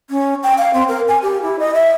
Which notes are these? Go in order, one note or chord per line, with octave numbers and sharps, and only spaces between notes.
C#4
G5
F5
C4
A#4
G#5
G4
E4
D#5
E5